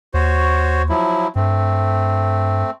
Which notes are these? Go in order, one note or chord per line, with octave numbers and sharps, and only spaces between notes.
D#2 F#4 C5 C#5
F3 F#3 E4
G2 A3 C4